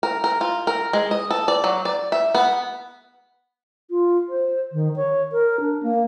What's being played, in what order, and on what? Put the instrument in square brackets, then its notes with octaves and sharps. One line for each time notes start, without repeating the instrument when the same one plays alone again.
[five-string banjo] A#4
A#4
F4
A#4
G#3
D#5
A4
D5
F#3
D5
E5
B3
[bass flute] F4
C5
D#3
C#5
A#4
D4
A#3